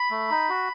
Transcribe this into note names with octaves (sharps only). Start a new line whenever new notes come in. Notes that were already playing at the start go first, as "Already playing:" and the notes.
Already playing: B5
A3
D#4
F#4